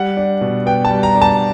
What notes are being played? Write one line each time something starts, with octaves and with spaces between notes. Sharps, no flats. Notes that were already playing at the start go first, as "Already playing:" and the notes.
Already playing: G3 F#5
D4
B2
B3 G5
A5
G3
A#5
D4
A5